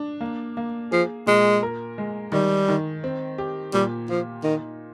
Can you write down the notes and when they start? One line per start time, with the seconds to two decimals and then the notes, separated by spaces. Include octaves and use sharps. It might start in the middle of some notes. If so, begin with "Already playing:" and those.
Already playing: D4
0.21 A#3
0.57 A#3
0.91 F3 G#4
1.27 A#2 G#3
1.63 A#4
1.98 G#3
2.32 D#3 G3
2.69 D#3
3.04 C4
3.38 G4
3.74 A#2 G3
4.09 F3 F4
4.44 D#3 D#4